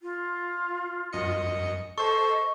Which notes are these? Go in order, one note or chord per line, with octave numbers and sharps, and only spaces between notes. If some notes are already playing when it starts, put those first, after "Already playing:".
F4
F#2 D#5 C#7
A4 C5 D#5 C#6